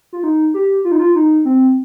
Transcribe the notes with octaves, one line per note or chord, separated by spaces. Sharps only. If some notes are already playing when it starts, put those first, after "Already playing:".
F4
D#4
G4
F4
D#4
F4
D#4
C4